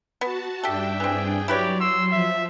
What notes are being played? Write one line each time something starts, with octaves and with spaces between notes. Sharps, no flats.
B3 F#4 A5
G2 D4 G4 A4 E5 G5
E3 C4 G#4
F#3 E4 G4 B4 C#5 D5
C6 E6
F3 E5